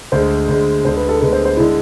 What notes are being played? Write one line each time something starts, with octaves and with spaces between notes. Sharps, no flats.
D2 D3 G#3 C5
D2 D3 G#3
D2 D3 G#3 C5
B4
A4
D2 D3 G#3 B4
C5
C5
D3 G#3 E4